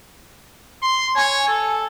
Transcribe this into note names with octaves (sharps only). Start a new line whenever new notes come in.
C6
C#5 G#5
A4